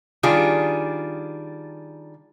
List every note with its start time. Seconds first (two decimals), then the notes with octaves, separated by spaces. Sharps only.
0.23 D#3 G3 D4 F4 G#4